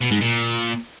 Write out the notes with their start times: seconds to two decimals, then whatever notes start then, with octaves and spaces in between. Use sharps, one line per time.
0.01 B2
0.11 G#2
0.21 A#2